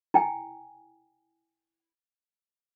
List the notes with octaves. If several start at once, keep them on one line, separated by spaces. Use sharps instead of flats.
E4 G5 G#5